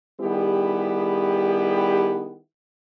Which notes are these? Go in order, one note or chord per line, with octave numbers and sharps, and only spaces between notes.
D#3 G3 B3 E4 G4 G#4